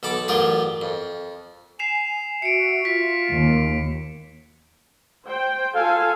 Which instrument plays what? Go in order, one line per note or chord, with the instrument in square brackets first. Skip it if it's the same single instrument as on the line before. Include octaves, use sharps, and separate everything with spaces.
[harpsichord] B1 A4 B5 D6
A1 F#2 F4 G4 G#4
F2
[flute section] G#5 [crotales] C7 E7 F7
[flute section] F#4 E5 [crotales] C#7 D7
[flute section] F4 [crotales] B6
[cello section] D#2
[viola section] C5 G5
[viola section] F4 A4 G#5 [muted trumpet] F5